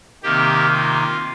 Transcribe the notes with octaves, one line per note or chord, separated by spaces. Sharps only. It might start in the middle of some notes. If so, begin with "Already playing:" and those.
C3 D#3 A#3 G4
F4